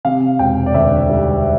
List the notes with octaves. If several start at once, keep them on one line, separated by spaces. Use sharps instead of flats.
C3 F5
E1 G5
D5
D2 E5
G3